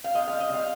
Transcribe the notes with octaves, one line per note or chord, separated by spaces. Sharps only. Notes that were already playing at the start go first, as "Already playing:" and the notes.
F5
C3 D#5
F5
G3
D#5
C3
F5